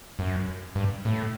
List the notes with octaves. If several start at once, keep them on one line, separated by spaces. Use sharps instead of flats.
F#2
G2
A2